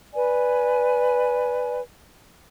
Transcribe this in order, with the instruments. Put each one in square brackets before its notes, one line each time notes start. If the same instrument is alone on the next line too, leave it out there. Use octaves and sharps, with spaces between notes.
[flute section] B4 D5 G#5